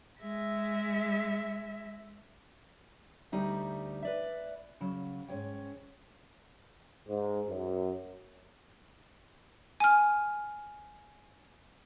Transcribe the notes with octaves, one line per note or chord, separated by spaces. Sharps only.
G#3 E5
D2 G3 D#4 E5
B4 D5 E5
C#3 F#3
G#2 C#4 C#5 G5
G#2
F#2
G#5 F6